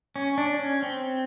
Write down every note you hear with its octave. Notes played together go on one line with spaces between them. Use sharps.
C#4
D4
C#4
C4